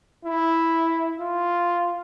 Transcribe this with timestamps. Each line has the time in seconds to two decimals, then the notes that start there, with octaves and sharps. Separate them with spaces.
0.24 E4
1.19 F4